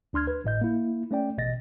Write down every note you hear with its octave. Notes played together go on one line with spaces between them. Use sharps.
D2 D4 C6 F6 G#6
B4
G#1 A2 D#5 G6
A#3 E4
A3 C#4 D5 G5
A1 B2 D#5 A6 A#6